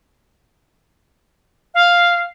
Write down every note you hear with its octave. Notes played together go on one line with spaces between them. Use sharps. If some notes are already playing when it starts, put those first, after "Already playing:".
F5